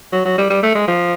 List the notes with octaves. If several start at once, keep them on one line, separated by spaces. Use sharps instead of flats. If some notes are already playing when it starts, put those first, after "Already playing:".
F#3
F#3
G3
G3
A3
G#3
F3